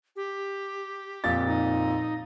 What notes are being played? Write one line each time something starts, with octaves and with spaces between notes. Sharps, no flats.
G4
F2 A#2 A6
D#4